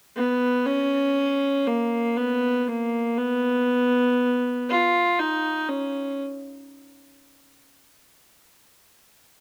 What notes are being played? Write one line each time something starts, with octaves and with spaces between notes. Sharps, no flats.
B3
C#4
A#3
B3
A#3
B3
F4
D#4
C#4